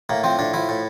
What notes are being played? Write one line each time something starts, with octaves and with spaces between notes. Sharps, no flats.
A2 A#3
F3 C4
A2 D4
F3 E4
A2